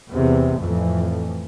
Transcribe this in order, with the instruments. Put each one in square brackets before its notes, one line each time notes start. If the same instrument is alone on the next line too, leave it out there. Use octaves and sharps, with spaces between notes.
[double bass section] E2 C3
F2 A2 E3